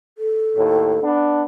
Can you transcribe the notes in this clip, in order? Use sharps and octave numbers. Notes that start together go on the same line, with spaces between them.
A4
D#2 A2
B3 D4